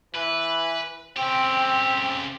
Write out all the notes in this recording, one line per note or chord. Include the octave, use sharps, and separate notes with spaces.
E3 B4
C#3 C4 G4